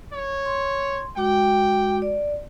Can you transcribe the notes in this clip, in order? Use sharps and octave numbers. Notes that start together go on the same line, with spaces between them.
C#5
C6
G#3 F#4 G5 D6
D5